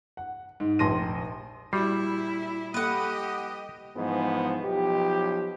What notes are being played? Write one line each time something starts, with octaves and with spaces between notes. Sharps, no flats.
F#5
G#2
F1 A#1 C6 A#6 D#7
A#2 G3 E4 F#4
A#3 G4 A4 B4 D#5 F#5
G#2 E3 F3 G#3 B3
B1 F3 G4